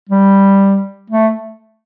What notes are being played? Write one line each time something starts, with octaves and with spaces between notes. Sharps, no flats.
G3
A3